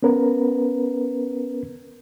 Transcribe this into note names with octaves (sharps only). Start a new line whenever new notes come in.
B3 C#4 A#4 B4